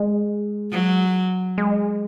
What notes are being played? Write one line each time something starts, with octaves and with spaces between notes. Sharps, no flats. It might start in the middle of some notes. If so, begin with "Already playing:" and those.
Already playing: G#3
F#3
G#3